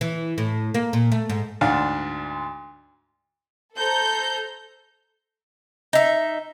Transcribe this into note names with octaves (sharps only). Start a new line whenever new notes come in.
E3
A2
A#3
A#2
A3
G#2
D2 G#2 D4 F5 F#5
A4 C5 A#5 G6
D#4 E5